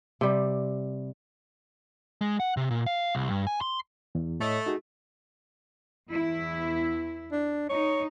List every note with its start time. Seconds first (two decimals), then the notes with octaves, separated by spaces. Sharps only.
0.21 C3 G3
2.21 G#3
2.40 F#5
2.57 C3
2.71 A#2
2.86 F5
3.15 C2
3.30 G2
3.47 G#5
3.61 C6
4.15 E2
4.40 A2 A3 C#5 D#5
4.66 D#4 F#4 G#4
6.08 E2 E4
7.32 D4
7.69 D#4 C#5